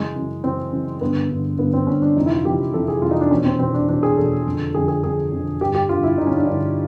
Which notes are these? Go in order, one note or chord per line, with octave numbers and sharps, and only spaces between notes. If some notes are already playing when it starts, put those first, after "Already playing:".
Already playing: F#2 C#3 E3 G#3
F#2 C#3 E3
F#2 C#3 E3 C4
F#2 C#3 E3
G2 D3 B3
G2 D3
G2 D3 B3
C4
G2 D3 C#4
D4
F2 C3 E3 D#4
E4
F4
F2 C3 E3 G4
F2 C3 E3 A4
G#4
F2 C3 E3 F4
D#4
D4
E2 B2 C#4
C4
E2 B2 C4
D4
E2 B2 D4
G#4
E2 B2 A4
F2 D3
F2 D3 G#4
G#4
F2 D3 G#4
F2 D3
G2 D3 G4
G4
G2 D3 F4
E4
G2 D3 D#4
C#4
D4
G2 D3 D#4